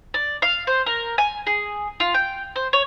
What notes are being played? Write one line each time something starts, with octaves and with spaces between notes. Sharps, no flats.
D5
F5
C5
A#4
G#5
G#4
F4
G5
C5
C#5